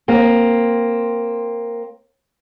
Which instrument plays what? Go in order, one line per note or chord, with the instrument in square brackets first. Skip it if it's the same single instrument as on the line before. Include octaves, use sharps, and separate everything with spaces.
[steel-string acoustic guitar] A#3 C4